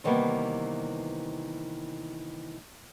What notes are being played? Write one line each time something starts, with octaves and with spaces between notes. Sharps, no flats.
C3 D#3 E3 G3 A#3 B3